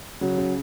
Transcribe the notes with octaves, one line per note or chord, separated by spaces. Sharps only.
C#3 F#3
C#3